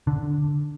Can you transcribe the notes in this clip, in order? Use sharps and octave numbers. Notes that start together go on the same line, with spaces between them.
D3